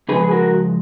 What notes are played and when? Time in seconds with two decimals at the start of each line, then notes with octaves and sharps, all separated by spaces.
0.09 C#3 F3 G#3 G#4 B4
0.23 G#4
0.31 F#4 A#4